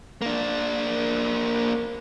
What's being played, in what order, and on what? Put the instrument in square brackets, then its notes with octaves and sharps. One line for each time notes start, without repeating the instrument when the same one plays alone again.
[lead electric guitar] A#3 D4